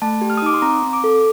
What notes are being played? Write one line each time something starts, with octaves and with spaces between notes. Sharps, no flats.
A3 A5
G4
F6
D#6
D#4 D6
C6
C4 A#5
C4
D6
A4